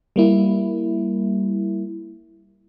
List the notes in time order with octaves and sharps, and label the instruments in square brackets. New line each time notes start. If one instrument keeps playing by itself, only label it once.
[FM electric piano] G3 A#3 E4